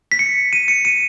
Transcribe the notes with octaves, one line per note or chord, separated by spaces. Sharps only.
B6
C#7
D#7
C#7
D#7